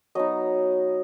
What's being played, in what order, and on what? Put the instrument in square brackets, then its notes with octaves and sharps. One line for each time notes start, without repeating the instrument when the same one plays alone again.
[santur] F#3 B3 D#4 D#5